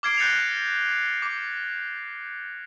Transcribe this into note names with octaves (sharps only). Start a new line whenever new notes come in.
D6 F6 G#6 C7 D7
F#6 G6 A6 A#6 C#7 F7
D6